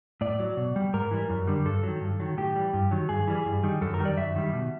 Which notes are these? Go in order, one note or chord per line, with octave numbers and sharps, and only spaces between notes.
A2 D5
F#3
B2
G3
G#2 A#4
E3 G3
F#2
D3 G3
G2 A4
D#3 F#3
G2
D#3 F#3
A2 G4
E3 G3
G2
D#3 F#3
G2 G#4
E3 G3
G2
D#3 G3
F#2 A4
A#4
D#3 G3
D5
F#2 E5
D#3 G3
B2